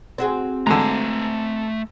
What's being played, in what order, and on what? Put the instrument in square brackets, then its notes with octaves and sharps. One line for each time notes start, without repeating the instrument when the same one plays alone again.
[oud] C4 F#4 G#4
[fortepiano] G#2 D3 [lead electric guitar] A3 A#5